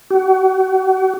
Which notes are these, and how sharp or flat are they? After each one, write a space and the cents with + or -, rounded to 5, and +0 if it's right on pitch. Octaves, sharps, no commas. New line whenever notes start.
F#4 +40